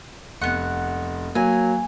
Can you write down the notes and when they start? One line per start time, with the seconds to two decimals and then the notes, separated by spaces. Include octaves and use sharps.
0.41 F1 B3 F#5
1.35 F#3 A#3 G#5